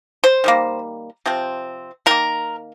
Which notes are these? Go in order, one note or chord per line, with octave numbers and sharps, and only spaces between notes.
C5
D#3 G3 A#3
C3 F3 C4
D#3 A#3 A#4